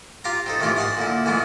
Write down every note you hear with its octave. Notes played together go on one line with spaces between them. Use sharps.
F4 G4 F5 A#5
C4 D#4 A4
C3 D#3 E3 A3 F4 G4
D#5 F5 F#5 G#5 A5
A#2 D3 E4
A#2 E3 G#3 A3 B3